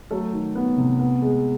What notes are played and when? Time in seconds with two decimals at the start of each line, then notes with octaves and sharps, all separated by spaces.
0.11 F#3 A3 A4
0.33 D#3
0.55 B3
0.77 C3
0.99 B3
1.22 G#3